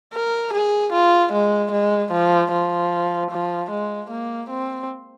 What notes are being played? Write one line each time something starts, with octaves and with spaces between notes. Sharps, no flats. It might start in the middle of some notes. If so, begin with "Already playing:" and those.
A#4
G#4
F4
G#3
G#3
F3
F3
F3
G#3
A#3
C4